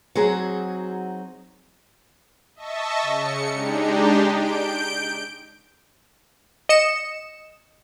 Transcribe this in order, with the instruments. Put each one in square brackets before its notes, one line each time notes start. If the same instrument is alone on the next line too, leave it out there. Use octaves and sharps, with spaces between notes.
[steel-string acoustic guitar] F#3 C4 D#4 F#4 G#4
[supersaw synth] D#5 E5 A5 C#6
C#3 C#7
G#3 D4 D#4 G4
G6 D7
[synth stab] D#5 C#7 E7